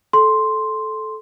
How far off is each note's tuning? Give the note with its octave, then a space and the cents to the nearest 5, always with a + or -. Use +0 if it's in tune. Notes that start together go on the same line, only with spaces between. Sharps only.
A4 -15 C6 +0